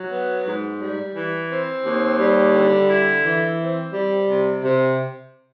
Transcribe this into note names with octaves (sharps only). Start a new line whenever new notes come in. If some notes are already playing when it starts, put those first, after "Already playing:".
Already playing: F#3
B3
G#2
G3
E3
C4
D#2
G3
D3
E4
E3
C4
G3
C3
C3